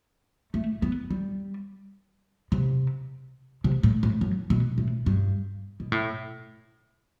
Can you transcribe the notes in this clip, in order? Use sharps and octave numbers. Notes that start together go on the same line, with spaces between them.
A3
B3
G3
C3
C3
A2
A2
F#2
B2
A2
G2
B2
A2